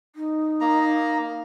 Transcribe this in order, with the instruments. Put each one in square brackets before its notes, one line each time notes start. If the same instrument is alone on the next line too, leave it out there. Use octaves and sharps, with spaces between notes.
[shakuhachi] D#4
[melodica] A#3 A#5